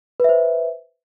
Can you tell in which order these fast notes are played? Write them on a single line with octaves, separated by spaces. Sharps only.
B4 E5 C5